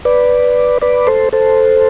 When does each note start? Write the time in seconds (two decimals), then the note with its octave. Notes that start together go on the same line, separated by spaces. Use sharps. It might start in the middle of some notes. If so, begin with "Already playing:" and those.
0.05 B4 D5
0.82 B4 D5
1.07 A4 C5
1.33 A4 C5